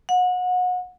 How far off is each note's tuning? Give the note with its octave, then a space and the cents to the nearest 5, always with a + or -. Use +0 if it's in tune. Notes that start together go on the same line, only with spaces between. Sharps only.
F#5 -30